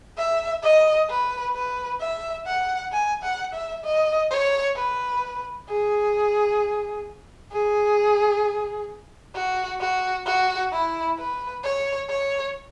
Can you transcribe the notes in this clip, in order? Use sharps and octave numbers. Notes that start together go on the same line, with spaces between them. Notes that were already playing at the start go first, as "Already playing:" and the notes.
E5
D#5
B4
B4
E5
F#5
G#5
F#5
E5
D#5
C#5
B4
G#4
G#4
F#4
F#4
F#4
E4
B4
C#5
C#5